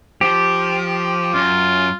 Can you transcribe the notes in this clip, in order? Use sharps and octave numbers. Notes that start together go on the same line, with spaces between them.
F3 G4
F#2 F4